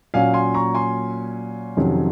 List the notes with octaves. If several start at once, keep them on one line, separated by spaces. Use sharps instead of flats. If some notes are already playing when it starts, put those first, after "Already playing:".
A#2 F#3 A#3 C#4 F5 G#5
G#5 C6
A#5 C#6
G#5 C6
F2 C3 D#3 F#3 C#4